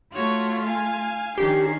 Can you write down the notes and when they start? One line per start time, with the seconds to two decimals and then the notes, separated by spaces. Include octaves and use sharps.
0.12 A3 F4 F#4 C#5
0.63 F5 G#5
1.38 D#3 C#4 D4 G4 C7